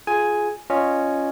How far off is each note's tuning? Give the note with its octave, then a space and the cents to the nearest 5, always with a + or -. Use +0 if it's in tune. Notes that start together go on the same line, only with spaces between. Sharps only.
F4 +0 G#4 +15 G#5 +0
C#4 +0 F4 +0 D#5 -15